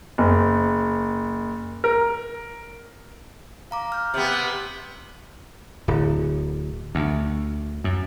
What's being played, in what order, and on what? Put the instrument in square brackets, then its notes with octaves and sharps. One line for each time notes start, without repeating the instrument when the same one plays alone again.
[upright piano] F#1
A#4
[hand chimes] F5 A#5 D6
F6 G6
[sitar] C3 B3
[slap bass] D1
D2
F#2